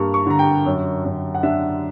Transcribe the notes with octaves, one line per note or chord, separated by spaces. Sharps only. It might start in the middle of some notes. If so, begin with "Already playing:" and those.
Already playing: G2 A#3 C#6
C#6
D3 A#5
G5
F#2
F#2
F#5
D4 E5